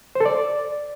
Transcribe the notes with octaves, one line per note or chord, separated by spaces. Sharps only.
C5
A4
D5